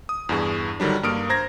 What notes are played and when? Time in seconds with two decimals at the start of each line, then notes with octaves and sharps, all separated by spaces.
0.09 D#6
0.29 E2 G2 G#4
0.80 D3 D#3 F#3 G3 D4
1.03 G2 A#3 D#6 F6 D7
1.30 C5 A#5 G#6 A#6